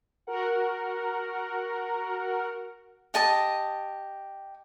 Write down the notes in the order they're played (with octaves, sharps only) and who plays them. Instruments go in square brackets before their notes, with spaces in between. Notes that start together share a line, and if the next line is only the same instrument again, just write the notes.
[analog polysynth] F#4 A#4 F#5
[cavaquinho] G4 D#5 A5 D#6